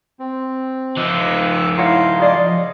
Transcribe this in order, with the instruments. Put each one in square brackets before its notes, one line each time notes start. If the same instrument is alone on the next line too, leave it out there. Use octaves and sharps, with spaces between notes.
[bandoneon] C4
[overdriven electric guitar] F3 D#4 [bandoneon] D6 E6 F#6
[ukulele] E4 C#5 F#5 [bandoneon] F5 A#5 C6
[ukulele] G#4 D5 D#5